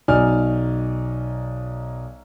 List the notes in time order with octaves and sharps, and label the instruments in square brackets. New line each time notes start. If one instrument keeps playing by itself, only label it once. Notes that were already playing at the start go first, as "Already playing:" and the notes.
[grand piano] B1 D#4 D5 G#5 F6